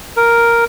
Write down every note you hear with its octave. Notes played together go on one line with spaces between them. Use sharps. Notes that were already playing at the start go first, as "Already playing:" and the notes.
A#4